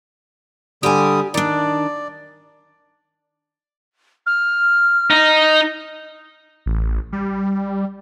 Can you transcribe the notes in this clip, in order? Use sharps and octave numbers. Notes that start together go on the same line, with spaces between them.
D3 G3 G4 G#5 D#6
D#3 D4 D5
F6
D#4
A1
G3